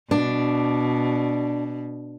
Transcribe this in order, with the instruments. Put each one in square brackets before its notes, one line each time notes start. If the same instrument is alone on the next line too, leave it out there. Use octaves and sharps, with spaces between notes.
[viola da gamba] B2 [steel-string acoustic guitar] D4